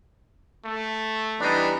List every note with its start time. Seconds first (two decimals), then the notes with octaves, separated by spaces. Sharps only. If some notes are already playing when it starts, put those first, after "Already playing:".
0.65 A3
1.40 E3 G3 B3 D4 D#4